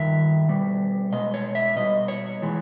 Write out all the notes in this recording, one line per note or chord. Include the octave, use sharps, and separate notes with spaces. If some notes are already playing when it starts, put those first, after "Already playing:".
Already playing: G2 D#3 E5
B2 G3
B2 G#3 D#5
C#5
E5
B2 G3 D#5
C#5
E3 G#3